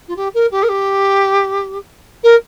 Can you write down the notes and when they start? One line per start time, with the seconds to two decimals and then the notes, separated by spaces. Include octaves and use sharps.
0.08 F4
0.16 G4
0.34 A#4
0.51 G4
0.63 A#4
0.68 G4
2.23 A#4